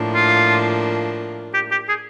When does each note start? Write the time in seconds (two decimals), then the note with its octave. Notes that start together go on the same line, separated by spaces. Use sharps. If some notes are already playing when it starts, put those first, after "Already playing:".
Already playing: A2 F3 A#3 D4
0.15 F4
1.54 G4
1.71 G4
1.89 G#4